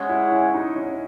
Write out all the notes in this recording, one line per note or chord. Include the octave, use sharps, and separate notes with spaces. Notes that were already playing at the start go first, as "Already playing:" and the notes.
Already playing: G#3 C#4 G#4 C#5 F#5
E4
E4
D#4
C#4